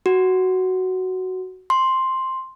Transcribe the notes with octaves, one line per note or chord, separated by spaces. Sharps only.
F#4
C6